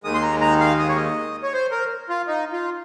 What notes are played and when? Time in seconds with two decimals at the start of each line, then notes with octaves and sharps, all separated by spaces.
0.04 D#2 D#3 G#3 D#6
0.15 C6
0.23 A#5
0.41 A#5
0.60 F5
0.79 D#5
0.88 C#5
0.97 D#5
1.43 C#5
1.53 C5
1.71 A#4
2.09 F4
2.27 D#4
2.53 F4